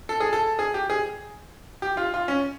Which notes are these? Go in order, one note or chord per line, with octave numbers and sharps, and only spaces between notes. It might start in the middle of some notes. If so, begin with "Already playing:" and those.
A4
G#4
A4
G#4
G4
G#4
G4
F4
F4
C#4